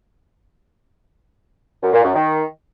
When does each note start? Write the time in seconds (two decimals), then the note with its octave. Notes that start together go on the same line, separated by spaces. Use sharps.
1.82 F#2
1.93 A#2
2.04 F#2
2.14 D#3